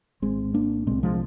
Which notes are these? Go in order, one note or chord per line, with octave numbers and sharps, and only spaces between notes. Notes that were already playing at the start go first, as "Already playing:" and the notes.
G#1 G#2 G#3 C4
A#3 D4
C2 A#2 G#3 C4
F3 G#3